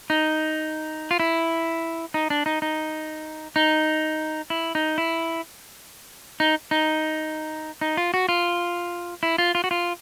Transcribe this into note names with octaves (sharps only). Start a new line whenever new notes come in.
D#4
F4
E4
D#4
D4
D#4
D#4
D#4
E4
D#4
E4
D#4
D#4
D#4
F4
F#4
F4
E4
F4
F4
F#4
F4